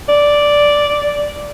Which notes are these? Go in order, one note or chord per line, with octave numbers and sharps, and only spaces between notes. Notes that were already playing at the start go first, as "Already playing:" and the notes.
D5